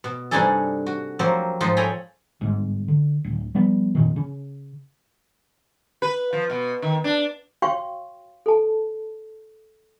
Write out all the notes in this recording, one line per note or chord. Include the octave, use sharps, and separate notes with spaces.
B2
G2 C3 D4 D#4 G#4 A4
F#4
F3 F#3 A#3 C4
G#2 F3 D#4
A4 C#5 G5 G#5 A#5 B5
G1 G#2
D3
D1
F3 G3 B3
F2 A#2 D#3
C#3
B4
F3
B2
D#3
D4
F#4 C#5 F5 G5 C6 C#6
A4 A5